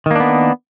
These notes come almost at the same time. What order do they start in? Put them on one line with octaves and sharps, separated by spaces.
D#3 A#3 D4 B3